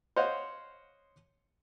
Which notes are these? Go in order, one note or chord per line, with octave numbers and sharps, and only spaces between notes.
C5 C#5 D#5 F5 F#5